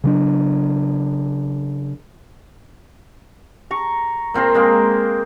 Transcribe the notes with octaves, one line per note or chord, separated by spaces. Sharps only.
C#3 F#3 D4
A#5 C#6
A#2 C4 A#4 C6
G#3 A#3 C4